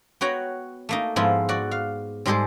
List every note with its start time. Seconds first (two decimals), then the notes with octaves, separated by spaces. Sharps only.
0.21 B3 F#4 C#5 G5 A#5
0.89 A3 A#3 D#4
1.16 G#2 F3 B3 E4 F4
1.49 F#4 D5
1.71 F5
2.26 G#2 G3 G#3 G4 A4 C5